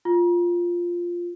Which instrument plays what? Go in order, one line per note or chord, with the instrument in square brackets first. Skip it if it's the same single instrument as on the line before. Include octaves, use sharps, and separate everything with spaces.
[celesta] F4